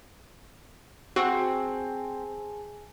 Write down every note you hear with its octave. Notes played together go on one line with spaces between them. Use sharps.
C4 F#4 G#4 G#5 A5